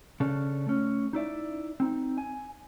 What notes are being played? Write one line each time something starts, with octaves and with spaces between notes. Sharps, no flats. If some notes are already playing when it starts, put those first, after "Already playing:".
C#3 C#4 D4 A4
A3 C#4
D#4 E4 D5 E5
C4 D#4
G#5